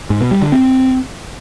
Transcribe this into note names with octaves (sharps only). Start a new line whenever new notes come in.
G#2
B2
G3
D3
C4